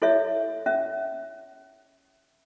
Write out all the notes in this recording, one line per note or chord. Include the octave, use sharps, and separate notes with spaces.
E4 A4 C#5 E5
C#4 E5